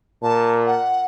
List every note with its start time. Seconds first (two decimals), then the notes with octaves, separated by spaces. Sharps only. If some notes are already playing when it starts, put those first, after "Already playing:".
0.23 A#2 A5
0.66 F#5